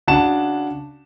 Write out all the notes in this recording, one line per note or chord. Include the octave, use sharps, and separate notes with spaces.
C#3 D4 F#4 F#5 A5 E7